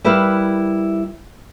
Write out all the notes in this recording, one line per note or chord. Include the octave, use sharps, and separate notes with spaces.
G3 E4 A#4 B4 E5 F5